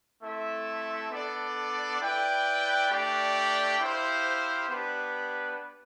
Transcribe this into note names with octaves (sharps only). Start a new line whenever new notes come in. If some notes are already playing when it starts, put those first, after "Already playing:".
A3 C4 E4 A4 E5
B3 D4 A4 D5
E4 B4 D5 G5
A3 D4 G4 D5 G5
E4 G4 C5 F5
B3 D4 G4 B4